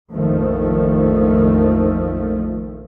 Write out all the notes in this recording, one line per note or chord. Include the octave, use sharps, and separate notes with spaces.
A#1 F2 D#3 F3 A3